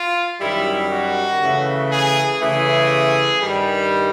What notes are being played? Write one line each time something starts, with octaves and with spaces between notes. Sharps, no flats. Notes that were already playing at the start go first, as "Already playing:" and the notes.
Already playing: F4
F#2 D#3 G3 E4
F#4
C#3 E3 A3
G#4
C#3 E3 A3 G#4
G2 D#3 G3